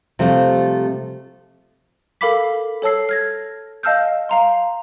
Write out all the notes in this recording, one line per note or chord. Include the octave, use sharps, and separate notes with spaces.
C3 F3 G3 A3
A4 A#4 F5 B5 D6 B6
A4 C#5 A5 E6 C7
F6 G#6 A#6
D#5 F5 A5 E6 F6 G6
F5 A#5 C6